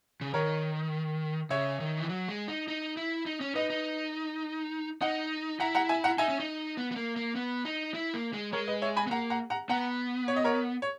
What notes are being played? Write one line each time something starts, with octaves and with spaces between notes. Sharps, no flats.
C#3
D#3 A#4 C#5
C#3 C#5 E5
D#3
E3
F#3
G#3
D#4
D#4
E4
D#4
C#4
D#4 B4 D#5
D#4
D#4 D#5 F#5
E4 F#5 A#5
F#5 A#5
E5 G#5
F#5 A#5
D#4 E5 G#5
C#4
D#4
B3
B3
A#3
A#3
B3
D#4
E4
A#3
G#3
G#3 A#4 C#5
B4 D#5
C#5 E5
G#5 B5
B3
A#3 F#5 A#5
F#5 A#5
F#5 A#5
B3 F#5 A#5
C#5
D#5
A#4 C#5
C#5